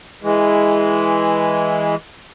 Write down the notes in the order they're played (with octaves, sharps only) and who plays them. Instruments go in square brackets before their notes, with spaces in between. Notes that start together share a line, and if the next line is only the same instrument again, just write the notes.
[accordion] E3 G#3